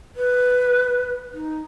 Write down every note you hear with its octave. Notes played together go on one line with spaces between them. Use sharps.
B4
D#4